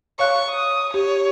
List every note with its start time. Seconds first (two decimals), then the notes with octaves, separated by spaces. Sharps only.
0.19 C#5 F5 C#6 F#6
0.50 D#6
0.94 G4 C#5